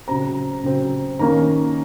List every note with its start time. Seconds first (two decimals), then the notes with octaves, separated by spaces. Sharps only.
0.08 C#3 F#3 C4 A#5
0.63 C#3 F#3 C4
1.19 D#3 A#3 C#4 A#5